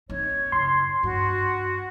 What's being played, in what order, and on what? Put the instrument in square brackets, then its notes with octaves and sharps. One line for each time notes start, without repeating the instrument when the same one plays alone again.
[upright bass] C4 D#4 [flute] C#5
[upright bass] F#1 [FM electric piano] C6
[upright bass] G2 [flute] F#4